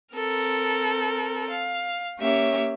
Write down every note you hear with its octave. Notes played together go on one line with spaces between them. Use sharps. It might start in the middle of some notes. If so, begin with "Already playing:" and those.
C4 A4 A#4
F5
A#3 C#4 G4 C#5 E5